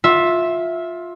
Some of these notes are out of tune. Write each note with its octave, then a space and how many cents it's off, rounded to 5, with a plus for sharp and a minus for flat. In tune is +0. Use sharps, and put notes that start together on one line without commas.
F4 +15 E5 -5